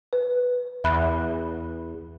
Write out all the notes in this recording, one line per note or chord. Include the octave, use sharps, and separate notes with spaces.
B4
E2 E5 B5 F#6